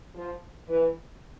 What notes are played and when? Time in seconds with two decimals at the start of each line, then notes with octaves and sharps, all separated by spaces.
0.14 F3
0.68 E3